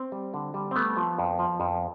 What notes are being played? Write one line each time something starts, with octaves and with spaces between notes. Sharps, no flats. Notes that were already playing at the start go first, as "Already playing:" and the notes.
Already playing: C4
G3
D3
G3
C4
A3 B3
F3
F2
F3
F2